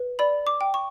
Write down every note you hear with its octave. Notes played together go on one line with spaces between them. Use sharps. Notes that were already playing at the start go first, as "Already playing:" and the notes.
Already playing: B4
D5 B5
D6
G5
C#6